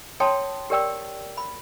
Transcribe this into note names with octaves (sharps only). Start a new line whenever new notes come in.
C#5 G5 A5 C6 D#6
G4 A#4 D5 G5 E6
B5